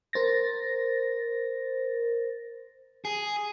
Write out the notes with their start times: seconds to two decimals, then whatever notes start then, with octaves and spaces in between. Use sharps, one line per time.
0.13 A#4 C5 A6 A#6
3.05 G#4